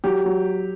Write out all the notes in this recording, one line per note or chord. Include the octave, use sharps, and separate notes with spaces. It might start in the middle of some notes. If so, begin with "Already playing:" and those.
F#3 G4
F#3